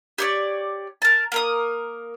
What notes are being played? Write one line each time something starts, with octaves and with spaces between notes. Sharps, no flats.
G4 C#5 D5
A#4 A5
A#3 A#4 D#6